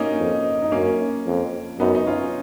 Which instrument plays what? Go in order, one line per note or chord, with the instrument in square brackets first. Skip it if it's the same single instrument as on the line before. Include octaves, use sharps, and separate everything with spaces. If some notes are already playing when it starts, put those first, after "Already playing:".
Already playing: [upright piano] A#3 C#4 D#4
[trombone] F2
[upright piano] D#4
[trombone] F#2 [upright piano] A#3 C#4
[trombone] F2
[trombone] F#2 [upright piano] B3 D#4
[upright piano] D#4
C#4 F4